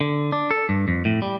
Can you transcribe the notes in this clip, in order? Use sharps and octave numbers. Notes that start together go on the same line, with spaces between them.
D3
D4
A4
G2
F2
A2
G3